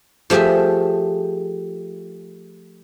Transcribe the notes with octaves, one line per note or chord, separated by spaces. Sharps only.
F3 A3 G4 G#4 E5